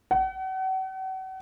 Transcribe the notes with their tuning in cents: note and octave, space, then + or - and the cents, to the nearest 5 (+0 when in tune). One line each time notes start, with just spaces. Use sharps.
F#5 +40